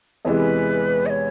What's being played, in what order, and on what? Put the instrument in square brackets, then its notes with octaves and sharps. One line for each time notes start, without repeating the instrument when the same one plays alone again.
[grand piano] E2 C3 E3 G#3 [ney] B4 C#5
[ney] D#5
C#5